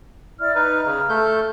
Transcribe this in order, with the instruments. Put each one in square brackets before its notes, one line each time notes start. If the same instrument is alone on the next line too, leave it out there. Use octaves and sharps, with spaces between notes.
[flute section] E4 D5 F6
[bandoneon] D#4 B4 [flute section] F6
[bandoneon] C#3
A3 A4 G6